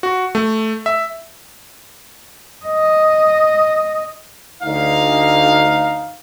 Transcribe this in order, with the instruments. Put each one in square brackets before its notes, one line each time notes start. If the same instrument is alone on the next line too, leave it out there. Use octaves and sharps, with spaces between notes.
[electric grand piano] F#4
A3
E5
[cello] D#5
[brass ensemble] D2 D#4 F5